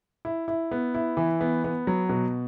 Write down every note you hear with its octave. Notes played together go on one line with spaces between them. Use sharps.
E4
E4
B3
E4
E3
B3
B3
F#3
B2